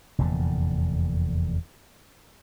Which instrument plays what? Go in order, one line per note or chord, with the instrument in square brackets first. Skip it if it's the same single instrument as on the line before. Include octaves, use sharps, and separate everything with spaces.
[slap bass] F1 E2 A#2 D3